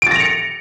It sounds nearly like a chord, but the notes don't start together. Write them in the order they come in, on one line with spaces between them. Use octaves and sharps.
D7 A6 A#6 F7 C#7